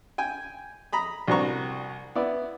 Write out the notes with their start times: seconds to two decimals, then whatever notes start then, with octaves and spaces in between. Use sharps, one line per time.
0.18 G5 G#5
0.93 A#5 B5 D#6
1.28 C2 D4 F#4 C5 A#5 C#6
2.15 B3 E4 D5